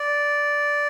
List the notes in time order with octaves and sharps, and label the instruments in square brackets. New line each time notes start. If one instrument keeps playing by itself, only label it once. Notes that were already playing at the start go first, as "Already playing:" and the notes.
Already playing: [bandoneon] D5